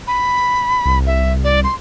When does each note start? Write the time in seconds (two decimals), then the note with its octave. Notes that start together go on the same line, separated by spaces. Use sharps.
0.07 B5
0.86 C2
1.07 E5
1.44 D5
1.64 C6